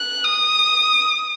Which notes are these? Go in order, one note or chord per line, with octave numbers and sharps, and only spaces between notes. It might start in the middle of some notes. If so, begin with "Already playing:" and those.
Already playing: F#6
D#6